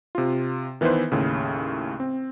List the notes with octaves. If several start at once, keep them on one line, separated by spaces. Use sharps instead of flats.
C3 F4
D#3 E3 B3 E4 B4 C5
D#2 A2 C#3
C4